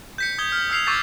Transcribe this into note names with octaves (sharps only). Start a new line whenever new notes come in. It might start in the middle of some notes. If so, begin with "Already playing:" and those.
G6 B6 C#7
D#6 G#6 G7
F6
E6 F6 C7 F7
C#6 D6 E6 G6 A6 C7